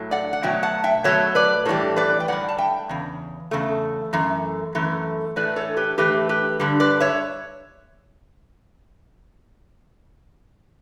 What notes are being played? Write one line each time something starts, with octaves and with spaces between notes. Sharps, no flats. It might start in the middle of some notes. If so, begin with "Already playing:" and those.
Already playing: A2 F#3 A3
D5 F#5
F#5
B2 F#3 A3 E5 G5
F#5 A5
E5 G5
B2 F#3 A3 C#5 E5
B4 D5
A2 E3 G3 A4 C#5
B4 D5
G5
A2 E3 G3 D5 F#5
A5
E5 G5
E2 C#3
E2 C#3 A3
F#2 E3 A3
F#2 E3 A3
A2 E3 A3 B4 D5
A4 C#5
G4 B4
A2 E3 A3 G4 B4
G4 B4
G2 D3 G3
B4 D5
C#5 E5